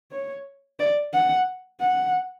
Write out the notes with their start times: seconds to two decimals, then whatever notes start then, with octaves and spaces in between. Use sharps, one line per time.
0.12 C#5
0.79 D5
1.13 F#5
1.80 F#5